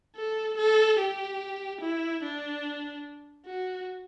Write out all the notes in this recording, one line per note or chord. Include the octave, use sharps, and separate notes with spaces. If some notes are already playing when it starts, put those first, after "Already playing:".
A4
A4
G4
E4
D4
F#4